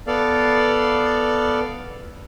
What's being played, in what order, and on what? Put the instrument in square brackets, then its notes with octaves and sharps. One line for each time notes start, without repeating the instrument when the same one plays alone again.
[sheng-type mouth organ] B3 A4 D5 F5